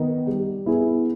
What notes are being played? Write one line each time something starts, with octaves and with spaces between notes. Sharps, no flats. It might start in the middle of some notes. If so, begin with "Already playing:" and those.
Already playing: D#3 B3 D#4
G3
B3 E4 G#4